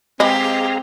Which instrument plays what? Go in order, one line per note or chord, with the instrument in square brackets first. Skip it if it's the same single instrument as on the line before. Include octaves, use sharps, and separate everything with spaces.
[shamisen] G#3 B4 D#5 [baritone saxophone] C4 [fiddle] G4 [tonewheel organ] G#4 F5 A#5